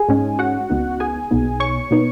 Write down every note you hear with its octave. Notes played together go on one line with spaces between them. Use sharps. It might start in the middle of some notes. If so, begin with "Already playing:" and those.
Already playing: G#4 G#5
G#2 G#3 C#4
F#4 F#5
C#2 C#3 B3 D#4
G#4 G#5
B1 B2 B3 D#4
C#5 C#6
B2 B3 D#4